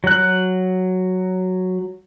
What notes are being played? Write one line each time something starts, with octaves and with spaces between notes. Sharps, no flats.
F#3 F#6